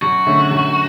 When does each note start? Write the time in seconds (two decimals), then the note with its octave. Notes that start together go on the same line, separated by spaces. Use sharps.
0.02 F#2 F#4
0.27 D3 A3 C#4
0.51 F#2